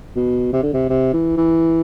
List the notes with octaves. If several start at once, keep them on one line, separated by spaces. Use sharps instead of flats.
B2
C3
D3
C3
C3
E3
E3